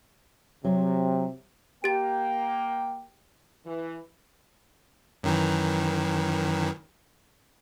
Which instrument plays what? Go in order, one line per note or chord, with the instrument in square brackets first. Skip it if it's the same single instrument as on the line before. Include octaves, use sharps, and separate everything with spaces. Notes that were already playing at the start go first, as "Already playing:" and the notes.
[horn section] C3 [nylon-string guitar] F#3
[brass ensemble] A#3 G5 [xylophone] G4 A6
[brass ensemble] E3
[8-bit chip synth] F#2 D#3 E3